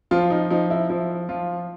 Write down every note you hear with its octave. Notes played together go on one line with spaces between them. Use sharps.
F3 F4
D#4
F3 D#4
E4
F3 E4
F3 F4